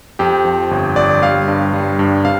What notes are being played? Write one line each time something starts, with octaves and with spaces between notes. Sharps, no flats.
F2 G4
F3
G1
G1 D5
G3 F5
G2
G3
G2
C3 F5